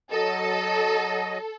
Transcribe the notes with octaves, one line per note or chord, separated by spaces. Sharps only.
F#3 A4 D#5